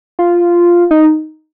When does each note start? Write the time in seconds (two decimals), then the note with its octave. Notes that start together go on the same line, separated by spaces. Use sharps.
0.19 F4
0.91 D#4